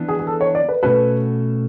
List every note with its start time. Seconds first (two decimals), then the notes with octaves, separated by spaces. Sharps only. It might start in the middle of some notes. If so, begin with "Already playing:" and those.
Already playing: E3 B3 D4
0.08 G#4
0.20 G#4
0.27 A4
0.41 C#5
0.55 D5
0.69 B4
0.83 B2 A3 C#4 F#4 A4 B4